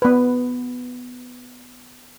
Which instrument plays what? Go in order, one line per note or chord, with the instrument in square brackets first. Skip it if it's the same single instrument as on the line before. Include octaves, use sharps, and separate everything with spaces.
[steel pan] B3 B4